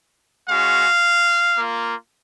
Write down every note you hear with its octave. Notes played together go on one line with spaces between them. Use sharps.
G#3 C#4 F#4 F5
A#3 F4